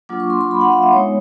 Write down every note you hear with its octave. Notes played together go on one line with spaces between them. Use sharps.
F#3 A#3 D4 F4 D6
C#6
C6
C6
B5
F#5
F5
E5
G#3 B3 D#4 C#5